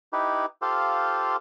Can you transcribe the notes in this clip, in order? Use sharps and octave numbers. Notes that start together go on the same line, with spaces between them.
D#4 E4 G4 B4
F4 G4 A4 C5 F5